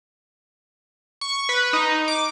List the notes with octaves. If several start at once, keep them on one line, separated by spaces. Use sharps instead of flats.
C#6
B4
D#4
D6